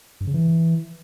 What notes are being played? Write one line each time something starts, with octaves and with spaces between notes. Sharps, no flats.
G2
C#3
E3